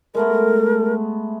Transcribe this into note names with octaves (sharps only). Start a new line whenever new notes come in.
G#3 A3 B3 A#4